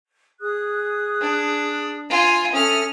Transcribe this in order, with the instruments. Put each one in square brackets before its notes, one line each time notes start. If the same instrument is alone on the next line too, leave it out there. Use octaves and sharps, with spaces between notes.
[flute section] G#4 D#6 F#6
[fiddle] D4
F4 G#5
[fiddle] C#4 F6 [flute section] A4 E5 D#6